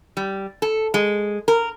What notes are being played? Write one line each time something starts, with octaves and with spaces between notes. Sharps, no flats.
G3
A4
G#3
A#4